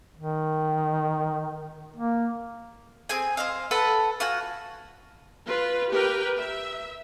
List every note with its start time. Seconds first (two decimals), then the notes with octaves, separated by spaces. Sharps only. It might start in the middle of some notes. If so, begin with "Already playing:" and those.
0.17 D#3
1.96 A#3
3.09 C4 G#4 G#5
3.37 C5 D#5 F5
3.71 A4 B4 F#5 A5
4.20 F4 F#4 F#5 G#5
5.46 F4 B4
5.90 G4 A#4 B4 G5
6.38 E5